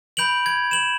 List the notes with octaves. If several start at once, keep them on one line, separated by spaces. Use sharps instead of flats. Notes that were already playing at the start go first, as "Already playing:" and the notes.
B5 G6 D7 F7 F#7
G#6
E7 F#7